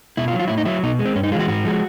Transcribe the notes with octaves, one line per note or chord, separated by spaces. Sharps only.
B2 E4
F4
F#3
F4
A2 E4
D#4
F#3 E4
B2 D#4
G#3
C4
G2 C#4
D#4
E3 G#3 F4 F#4
G#2 F#4
F3 G#3